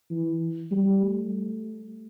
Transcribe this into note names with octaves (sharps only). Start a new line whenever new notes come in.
E3
G3
A3